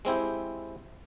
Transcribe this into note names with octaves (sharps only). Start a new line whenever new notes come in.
G#3 C4 E4 G4